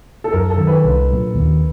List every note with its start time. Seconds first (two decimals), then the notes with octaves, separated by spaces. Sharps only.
0.24 A4
0.32 F#2 A#4
0.50 A4
0.58 D#3 F#3
0.67 B4
0.84 C2
1.09 A#2 F#3
1.35 D#2